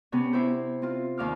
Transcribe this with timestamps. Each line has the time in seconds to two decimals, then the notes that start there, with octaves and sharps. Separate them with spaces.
0.12 C3 B3 C#4
0.33 E4 G4 C5
0.82 C4 F4
1.18 D#2 F5 D6 F6